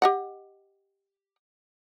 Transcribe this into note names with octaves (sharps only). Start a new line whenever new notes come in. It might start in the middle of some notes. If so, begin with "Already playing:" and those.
G4 D#5 F#5